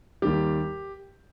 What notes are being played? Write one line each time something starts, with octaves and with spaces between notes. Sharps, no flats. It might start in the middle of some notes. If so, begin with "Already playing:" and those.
D#2 D#3 G3 G4